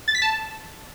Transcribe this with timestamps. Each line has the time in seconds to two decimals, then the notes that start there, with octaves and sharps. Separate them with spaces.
0.08 A6
0.15 B6
0.22 A5